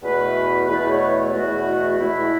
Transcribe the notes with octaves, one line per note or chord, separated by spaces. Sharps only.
E2 B2 A3 B4
E2 B2 A3 B4
B4
C#5
E2 B2 A3 F#4
E2 B2 A3 E4